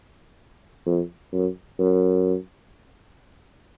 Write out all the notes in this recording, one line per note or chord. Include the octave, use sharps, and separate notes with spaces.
F2
F#2
F#2